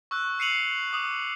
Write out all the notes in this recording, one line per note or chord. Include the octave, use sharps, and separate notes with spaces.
C#6 E6 F#6
E6 C7 C#7 D#7 F7 F#7
D6 D#6